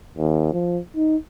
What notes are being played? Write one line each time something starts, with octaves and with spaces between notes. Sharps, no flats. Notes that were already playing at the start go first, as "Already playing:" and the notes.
D#2
F3
D#4